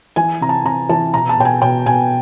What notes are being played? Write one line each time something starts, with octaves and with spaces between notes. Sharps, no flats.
E3 G#5
C3 A#5
A5
C3 A#5
E3 A5
B2 A#5
A5
B2 G5
G#5
B2 G5
B2 G#5